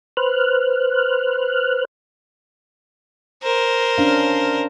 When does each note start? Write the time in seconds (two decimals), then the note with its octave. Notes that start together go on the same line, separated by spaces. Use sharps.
0.17 B4 C5 F6 F#6
3.43 A#4 C5
3.98 C#4 D4 F5